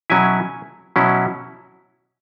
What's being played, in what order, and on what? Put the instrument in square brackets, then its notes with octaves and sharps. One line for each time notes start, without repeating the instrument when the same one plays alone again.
[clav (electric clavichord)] B2 F#3 C#4 E4 G#5
B2 F#3 C#4 E4